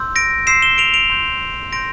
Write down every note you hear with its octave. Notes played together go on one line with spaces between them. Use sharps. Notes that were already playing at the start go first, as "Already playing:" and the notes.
Already playing: C6 E6 G6
A#6 D7
C6 E6 G6 C7 E7
E7 G7
D7 F7
D7 F7
C6 G6
C6 G6 A#6 D7